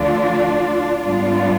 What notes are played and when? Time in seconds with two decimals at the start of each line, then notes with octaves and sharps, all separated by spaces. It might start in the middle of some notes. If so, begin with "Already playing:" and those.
Already playing: D2 D3 F3 D4 F4
1.02 G#2 G3 B3 D4 F4